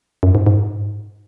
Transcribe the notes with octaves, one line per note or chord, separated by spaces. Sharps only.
F#2
G#2
G#2